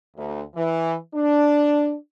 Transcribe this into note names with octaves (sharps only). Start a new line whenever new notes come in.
D2
E3
D4